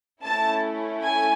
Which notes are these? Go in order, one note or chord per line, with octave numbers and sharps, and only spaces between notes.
A3 C#4 E4 A5
G#5